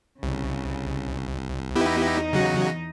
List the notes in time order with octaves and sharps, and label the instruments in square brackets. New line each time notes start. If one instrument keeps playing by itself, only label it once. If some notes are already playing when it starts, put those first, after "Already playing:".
[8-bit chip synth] C2 [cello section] C#3
[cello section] E2 D#4 D#5 [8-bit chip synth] B3 E4 G4
[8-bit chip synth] C#3 F#3 F#4